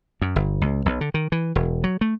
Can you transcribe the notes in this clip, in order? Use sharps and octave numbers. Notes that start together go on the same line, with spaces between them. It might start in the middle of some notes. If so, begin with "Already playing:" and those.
F#2
G1
C#2
B1
D3
D#3
E3
E1
F#3
A3